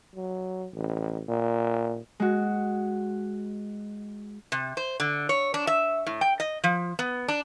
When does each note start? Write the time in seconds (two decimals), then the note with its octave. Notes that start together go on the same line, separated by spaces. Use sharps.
0.16 F#3
0.73 A1
1.28 A#2
2.20 G#3 F#4
4.52 C3
4.77 C5
5.00 D3
5.29 C#5
5.54 D4
5.67 E5
6.06 A2
6.21 G5
6.40 D#5
6.64 F3
6.99 B3
7.28 D4